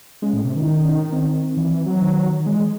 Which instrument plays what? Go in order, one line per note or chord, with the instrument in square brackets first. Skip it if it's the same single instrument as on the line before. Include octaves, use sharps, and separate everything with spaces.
[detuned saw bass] G#3 [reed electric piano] C#4
[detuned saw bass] A2
C3
D#3
[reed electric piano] E4
D#4
C#4
D#4
C4
[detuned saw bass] E3
E3
F#3
[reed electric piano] D#3
D#3
[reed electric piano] E3 [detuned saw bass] G#3